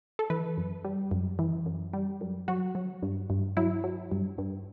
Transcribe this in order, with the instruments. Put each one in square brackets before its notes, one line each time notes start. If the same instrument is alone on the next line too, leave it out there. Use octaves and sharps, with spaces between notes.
[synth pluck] A4
E3 B4
F#2
G3
F#2
E3
F#2
G3
F#2
F#3 F#4
F#3
G2
G2
F#3 E4
F#3
G2
G2